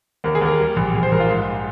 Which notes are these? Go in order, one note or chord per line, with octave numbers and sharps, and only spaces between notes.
D#2 A#4
G#4
D#2 A#4
G3
A#1
A#1 G#4
C5
A#1 A#4
F4
G#2